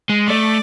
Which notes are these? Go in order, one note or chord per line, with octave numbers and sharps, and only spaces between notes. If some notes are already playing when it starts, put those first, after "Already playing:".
G#3
A3 D5